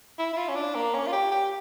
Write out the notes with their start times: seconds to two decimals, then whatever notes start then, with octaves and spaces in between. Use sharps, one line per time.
0.18 E4
0.33 E4
0.37 F4
0.48 C#4
0.56 D4
0.75 A#3
0.94 C#4
1.07 F4
1.13 G4
1.31 G4